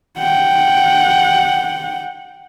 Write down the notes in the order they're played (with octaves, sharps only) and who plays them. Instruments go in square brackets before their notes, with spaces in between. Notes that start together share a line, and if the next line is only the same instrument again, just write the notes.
[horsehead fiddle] F#5 G5